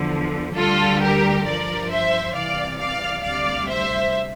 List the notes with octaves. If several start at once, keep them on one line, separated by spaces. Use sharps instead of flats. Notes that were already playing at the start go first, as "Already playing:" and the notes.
Already playing: E2 D3 F3
D2 D3 G3 F4 A4
G4 A#4
G2 F3 A#4 D5
C5 E5
C2 C3 E3 D5 F5
D5 F5
D2 C3 G3 D5 F5
C5 E5